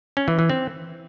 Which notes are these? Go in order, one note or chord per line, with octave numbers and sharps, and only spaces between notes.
C#4
E3
E3
C4